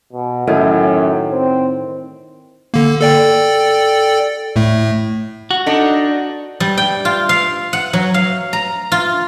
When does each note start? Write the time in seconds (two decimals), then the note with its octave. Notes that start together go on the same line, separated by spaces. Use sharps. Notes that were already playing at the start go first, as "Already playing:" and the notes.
0.13 B2
0.47 F#2 A2 D#3 E4
1.32 C4
2.74 D3 A#3
3.01 A4 D5 G5
4.56 A2 A3
5.51 F#4
5.66 D4 D#4 A4
6.60 G3
6.78 G5
7.05 F4
7.29 F5
7.73 F#5
7.93 F#3
8.14 F5
8.53 A#5
8.92 F4